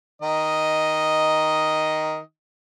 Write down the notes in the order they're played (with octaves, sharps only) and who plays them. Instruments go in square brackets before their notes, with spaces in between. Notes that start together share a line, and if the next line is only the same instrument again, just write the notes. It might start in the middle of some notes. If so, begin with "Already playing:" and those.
[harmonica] D#3 D#5